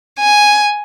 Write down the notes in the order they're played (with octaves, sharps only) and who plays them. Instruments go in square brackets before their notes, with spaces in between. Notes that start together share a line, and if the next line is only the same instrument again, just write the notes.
[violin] G#5